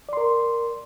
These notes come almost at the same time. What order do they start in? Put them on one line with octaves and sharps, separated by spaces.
D5 C6 A#4